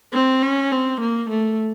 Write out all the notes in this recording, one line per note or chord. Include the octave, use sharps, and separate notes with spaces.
C4
C#4
C4
A#3
A3